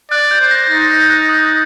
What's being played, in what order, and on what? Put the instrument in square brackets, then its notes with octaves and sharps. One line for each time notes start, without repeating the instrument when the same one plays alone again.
[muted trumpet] D5 [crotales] F#6
[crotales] G6
[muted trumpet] C5
[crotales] A#6
G6
[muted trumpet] D#4 [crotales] A6
[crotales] A6
G6
G6
F#6
D#6
G6